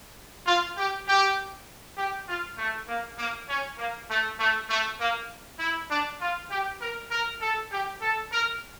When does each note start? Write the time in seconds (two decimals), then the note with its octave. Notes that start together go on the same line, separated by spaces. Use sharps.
0.46 F4
0.77 G4
1.07 G4
1.97 G4
2.28 F4
2.57 A3
2.88 A#3
3.17 A#3
3.47 C#4
3.78 A#3
4.09 A3
4.39 A3
4.69 A3
4.99 A#3
5.59 E4
5.89 D4
6.20 F4
6.50 G4
6.80 A#4
7.10 A#4
7.41 A4
7.70 G4
8.01 A4
8.31 A#4